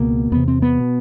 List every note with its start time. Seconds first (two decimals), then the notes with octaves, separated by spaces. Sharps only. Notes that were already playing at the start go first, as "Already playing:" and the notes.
Already playing: C#2 B2 A#3
0.32 E2 C3 B3
0.48 C4
0.62 B3
0.80 B2